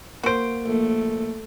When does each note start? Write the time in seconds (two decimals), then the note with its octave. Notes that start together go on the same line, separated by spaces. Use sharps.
0.23 A#3 F#4 C5 D7
0.66 A#1 A3